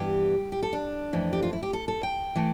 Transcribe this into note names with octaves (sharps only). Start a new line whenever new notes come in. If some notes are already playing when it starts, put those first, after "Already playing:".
Already playing: G2 E3 B3 G4
G4
A4
D4
F2 E3 A3
G4
F4
E4
G4
A4
A4
G5
E3 A3